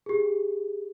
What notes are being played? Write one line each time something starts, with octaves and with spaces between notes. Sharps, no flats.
G4 G#4